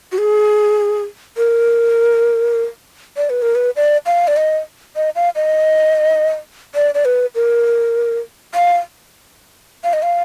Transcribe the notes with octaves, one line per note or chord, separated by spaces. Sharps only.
F#4
G#4
A#4
D5
B4
A#4
B4
D5
F5
D5
D#5
D#5
F5
D#5
D5
D5
B4
A#4
F5
F5
D#5
F5